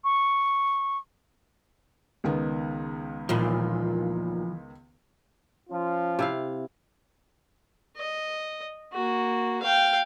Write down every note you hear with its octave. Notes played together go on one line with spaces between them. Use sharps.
C#6
C#2 D#3 B3
D#2 A#2 E3 F3
F3 C#4 F4
C3 E4 F5
D#5
A#3 F#4
F5 G5